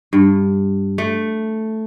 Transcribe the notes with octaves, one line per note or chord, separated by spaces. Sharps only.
G2
A3